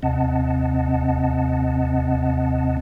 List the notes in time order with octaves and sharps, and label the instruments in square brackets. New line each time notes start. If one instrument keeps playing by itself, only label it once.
[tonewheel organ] D#2 C3 C4 D#5 F#5 A5